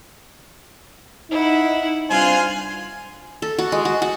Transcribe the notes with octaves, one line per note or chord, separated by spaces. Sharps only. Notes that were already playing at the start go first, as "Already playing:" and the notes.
D#4 E4 F#5
G2 C3 F4 C5 G#5 F#6
A4
F#4
G#3
F#4
F#4